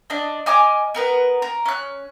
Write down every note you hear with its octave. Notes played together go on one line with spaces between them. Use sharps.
D4 D#5
D#5 G#5 D6 F6
B3 A#4 B4
A#4
C#4 F#6